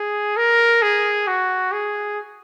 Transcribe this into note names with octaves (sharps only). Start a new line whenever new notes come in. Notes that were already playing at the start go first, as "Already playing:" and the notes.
Already playing: G#4
A#4
G#4
F#4
G#4